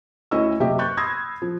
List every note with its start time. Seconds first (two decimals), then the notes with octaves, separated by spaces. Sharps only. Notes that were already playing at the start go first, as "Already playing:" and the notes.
0.31 D2 C#4 E4 D#5 C#6 E6
0.60 F#1 C3 G4 D#5 E5
0.79 C#6 F#6 G6 A6
0.97 B5 C6 D#6 E6 G#6 A#6
1.42 F3